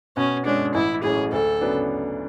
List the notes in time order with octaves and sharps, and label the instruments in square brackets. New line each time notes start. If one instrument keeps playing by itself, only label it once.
[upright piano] B2 [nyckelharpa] C#4
[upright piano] G#3 C#4 [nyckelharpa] D4
[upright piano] A1 [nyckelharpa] E4
[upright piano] A2 F#3 C#4 [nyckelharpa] G#4
[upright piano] D2 [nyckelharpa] A4
[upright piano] C#3 F#3 B3 D4